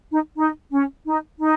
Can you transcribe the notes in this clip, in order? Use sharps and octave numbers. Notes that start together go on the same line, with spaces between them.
D#4
D#4
C#4
D#4
D#4